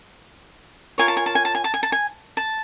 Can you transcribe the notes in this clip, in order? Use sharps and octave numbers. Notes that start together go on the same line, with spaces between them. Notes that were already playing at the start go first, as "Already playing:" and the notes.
F4 A#4 C#5 G#5
A5
G#5
A5
G#5
A5
G#5
A5
G#5
A5
G#5
A5